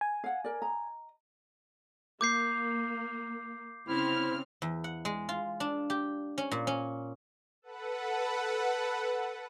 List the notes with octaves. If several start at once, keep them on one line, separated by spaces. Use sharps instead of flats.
G#5
F5 F#5
A#4 D5
D#5 A#5
A#3 D6 G6 C7
C#3 C4 E4 F6
E2
F#5
G#3
F4
D4
G4
C#4
A#2
C#4
A4 B4 F#5